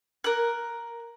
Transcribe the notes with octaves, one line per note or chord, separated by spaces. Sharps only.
A#4 F#6